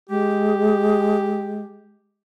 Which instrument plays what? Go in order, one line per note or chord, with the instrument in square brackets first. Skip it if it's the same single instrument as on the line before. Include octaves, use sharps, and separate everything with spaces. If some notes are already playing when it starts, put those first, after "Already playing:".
[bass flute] G#3 [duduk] G4